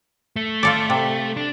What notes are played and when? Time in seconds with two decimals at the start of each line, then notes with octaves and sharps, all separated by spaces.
0.36 A3
0.63 F4 A4 D5
0.90 C3
1.37 D4